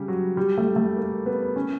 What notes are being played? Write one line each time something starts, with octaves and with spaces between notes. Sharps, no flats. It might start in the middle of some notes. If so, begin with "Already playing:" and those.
Already playing: C#3 G3
F#3
G3
A3
A3
A#3
B3
C#4